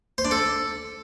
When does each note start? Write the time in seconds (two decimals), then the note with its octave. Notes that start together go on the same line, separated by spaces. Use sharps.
0.18 C5
0.25 D4
0.31 A4